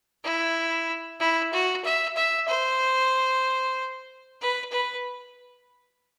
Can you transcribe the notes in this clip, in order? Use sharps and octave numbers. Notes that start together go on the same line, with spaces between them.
E4
E4
F#4
E5
E5
C5
B4
B4